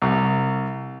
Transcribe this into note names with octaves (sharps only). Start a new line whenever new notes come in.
C2